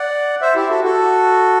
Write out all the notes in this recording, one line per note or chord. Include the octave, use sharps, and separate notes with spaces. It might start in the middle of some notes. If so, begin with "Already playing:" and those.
Already playing: D5 F#5
C5 E5
E4 G4
F#4 A4
F#4 A4